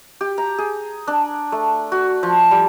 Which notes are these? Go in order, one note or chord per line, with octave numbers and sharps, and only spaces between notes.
G4
A#5
G#4
D4
A3
F#4
F3
G3